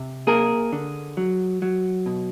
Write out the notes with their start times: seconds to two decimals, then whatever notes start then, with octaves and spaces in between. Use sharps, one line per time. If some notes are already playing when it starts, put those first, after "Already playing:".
Already playing: C3
0.27 A#3 G#4 A#4
0.72 D3
1.17 F#3
1.62 F#3
2.06 B2